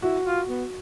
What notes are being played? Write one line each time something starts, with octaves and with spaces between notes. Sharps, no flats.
E4 F#4
F4
B3